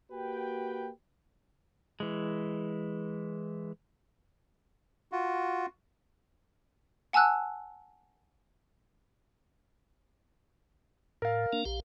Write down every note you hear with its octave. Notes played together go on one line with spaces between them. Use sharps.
A#3 F#4 G4 B4 G5
E3 G#3
F4 F#4
F#5 G#5 A5 E6 F#6
A2 A#4 F5
A#3 D4
A#1 G4 F5